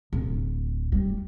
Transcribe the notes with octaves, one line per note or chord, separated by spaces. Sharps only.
D1
G3